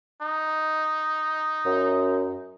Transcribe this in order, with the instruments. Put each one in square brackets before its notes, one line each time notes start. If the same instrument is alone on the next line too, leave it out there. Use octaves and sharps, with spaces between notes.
[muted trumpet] D#4
[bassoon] F#2